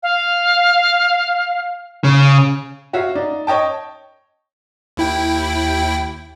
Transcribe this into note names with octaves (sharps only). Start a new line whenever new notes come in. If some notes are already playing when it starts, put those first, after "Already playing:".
F5
C#3
F4 F#4 C#5 E5 F5
D#4 D5
C#5 D#5 G5 A5
D#2 E4 G5